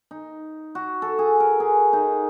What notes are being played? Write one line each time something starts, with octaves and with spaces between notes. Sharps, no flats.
D#4
F#4
A4
G#4
A#4
G#4
D#4